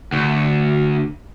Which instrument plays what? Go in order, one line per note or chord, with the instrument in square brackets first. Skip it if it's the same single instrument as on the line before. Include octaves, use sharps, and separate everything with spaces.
[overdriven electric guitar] D2